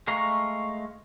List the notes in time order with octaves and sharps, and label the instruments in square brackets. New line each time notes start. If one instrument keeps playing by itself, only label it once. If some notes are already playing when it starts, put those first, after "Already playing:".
[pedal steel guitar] G#3 A3 F5 A#5 C#6